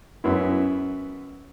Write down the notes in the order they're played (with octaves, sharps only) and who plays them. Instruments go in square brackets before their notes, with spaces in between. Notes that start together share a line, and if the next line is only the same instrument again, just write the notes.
[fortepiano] F#2 B3 E4